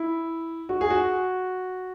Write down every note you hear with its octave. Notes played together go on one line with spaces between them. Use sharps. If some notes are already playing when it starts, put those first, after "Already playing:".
Already playing: E4
F#4
G#4
F#4